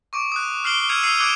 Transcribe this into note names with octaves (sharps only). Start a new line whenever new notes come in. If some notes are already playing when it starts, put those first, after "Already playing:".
C#6 D6 D7
D#6 F#6
F6 F#6 C7 D7 F#7 G7
E6 F6 G#6 C#7 D#7 F7
E6 C7 C#7 D#7 F7
D6 D#6 F#6 G#6 C#7 D7